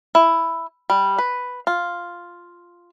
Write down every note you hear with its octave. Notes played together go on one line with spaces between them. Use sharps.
E4
G3
B4
F4